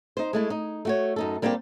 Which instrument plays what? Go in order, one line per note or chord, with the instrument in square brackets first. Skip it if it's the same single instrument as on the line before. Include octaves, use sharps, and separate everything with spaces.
[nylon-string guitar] D#4 C5
G#3 A3 E4
D#4
A3 F#4 C#5
F#2 D#4 A4
G3 A#3 C4 D4 F4 G4